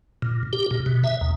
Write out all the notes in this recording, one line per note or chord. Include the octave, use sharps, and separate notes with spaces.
A#2
G4
A#2
B2
E5
D#2